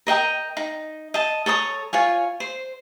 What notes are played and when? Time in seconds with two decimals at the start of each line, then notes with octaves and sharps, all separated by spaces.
0.07 A#4 D#5 G5 A#5
0.57 D#4
1.14 D#5 A5
1.46 A4 C#5 A#5 D#6
1.93 F4 C#5 G#5
2.40 C5